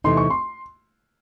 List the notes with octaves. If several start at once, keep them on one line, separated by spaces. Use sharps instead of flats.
E2 C3 E3 A3 D#4 C6
C#6
C6